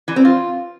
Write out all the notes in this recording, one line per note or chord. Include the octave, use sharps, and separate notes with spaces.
E3
C4
F4